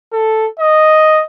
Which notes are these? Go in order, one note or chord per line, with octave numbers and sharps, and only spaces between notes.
A4
D#5